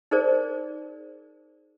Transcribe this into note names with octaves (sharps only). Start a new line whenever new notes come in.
D#4 G#4 A#4 C5 D5